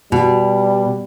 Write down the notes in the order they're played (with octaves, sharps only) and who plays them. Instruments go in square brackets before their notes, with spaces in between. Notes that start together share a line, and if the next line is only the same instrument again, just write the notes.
[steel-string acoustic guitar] B2 [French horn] G3